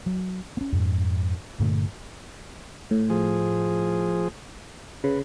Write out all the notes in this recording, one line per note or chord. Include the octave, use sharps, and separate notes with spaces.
F#3
B3 C#4
F2 G#2
G2 A#2 D3 A3
A2
F3 G#4
C#3 B4